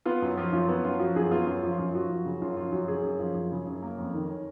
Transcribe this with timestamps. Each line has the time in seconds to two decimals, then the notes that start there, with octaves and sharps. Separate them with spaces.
0.05 B3 F4
0.22 F#2
0.37 F3 F4
0.52 F#2 F4
0.69 B3
0.84 F#2 F4
0.99 F3 F#4
1.16 F#2 G#4
1.31 B3 F4
1.47 F#2 F4
1.63 F3
1.71 F4
1.79 F#2
1.94 F3 F#4
2.10 F#2
2.25 C#3
2.42 F#2 F4
2.57 F3 F4
2.72 F#2 F#4
2.88 C#3 G#4
3.03 F#2
3.19 F3
3.35 F#2
3.52 C#3
3.67 F#2
3.82 A#3 A#4
3.98 F2
4.13 D#3
4.29 C#4